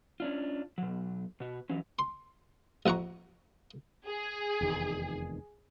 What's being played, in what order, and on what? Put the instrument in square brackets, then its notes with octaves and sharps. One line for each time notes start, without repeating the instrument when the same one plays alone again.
[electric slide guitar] C#4 D4 F4
B2 F#3
B2 F#4
E3 F#3 C#4
[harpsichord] C6
A1 F2 F#5 A#5 C#6
[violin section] G#4
[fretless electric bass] F1 E2 D#3